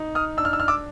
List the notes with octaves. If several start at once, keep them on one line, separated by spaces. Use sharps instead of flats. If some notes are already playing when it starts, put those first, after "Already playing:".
Already playing: D#4
D#6 F6
D4 E6
F6
E6
F6
D6 E6